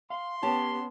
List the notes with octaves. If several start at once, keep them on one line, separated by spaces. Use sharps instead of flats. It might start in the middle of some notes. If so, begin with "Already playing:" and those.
F5 C6
B3 C#4 G4 C#5 A5